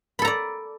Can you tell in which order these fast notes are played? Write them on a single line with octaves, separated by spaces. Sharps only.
B5 A4 A#5 D5